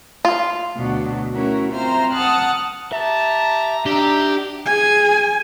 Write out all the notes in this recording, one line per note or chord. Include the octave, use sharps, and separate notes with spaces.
F4
D2 B2 F#3 D4
A3 C#4 E4 F#4 A#4
C4 F4 C5 E5 A#5 F6
F#5 A5 D#6 F6 F#6
G4 E5 A5 A#5
D4 D#4 G4 E5 A#5
G#4 G#5